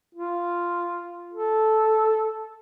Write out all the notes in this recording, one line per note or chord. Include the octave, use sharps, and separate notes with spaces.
F4
A4